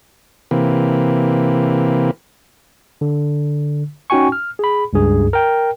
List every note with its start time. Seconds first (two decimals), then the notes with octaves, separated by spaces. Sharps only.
0.51 C3 E3 A#3
3.01 D3
4.10 C#4 D#4 F#4 G5 G#5 C#6
4.32 F6
4.59 G#4 B5
4.93 C#2 G2 G#4
5.33 A#4 G5